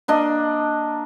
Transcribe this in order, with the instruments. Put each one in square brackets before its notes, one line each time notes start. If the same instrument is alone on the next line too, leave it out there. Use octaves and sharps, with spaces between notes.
[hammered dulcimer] A#3 D4 D#5